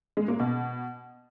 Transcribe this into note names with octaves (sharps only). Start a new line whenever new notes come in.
G#3
A#3
B2